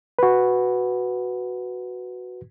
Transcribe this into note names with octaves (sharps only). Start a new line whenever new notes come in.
F#4 B4